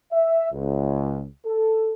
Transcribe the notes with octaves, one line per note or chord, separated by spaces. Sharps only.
E5
C#2
A4